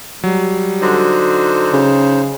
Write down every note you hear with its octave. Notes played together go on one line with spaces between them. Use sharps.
F#3 G3
D3 D#4 F#4 C5
C#3